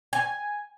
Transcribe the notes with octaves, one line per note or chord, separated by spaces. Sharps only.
G#5